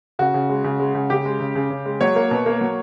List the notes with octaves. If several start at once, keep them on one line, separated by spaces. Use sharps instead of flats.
C#3 F#4
C#3
G#3
C#3
G#3
C#3
C#3 G4
G#3
C#3
C#3
C#3
G#3
F#3 C#5
A#3
B2
A#3
F#3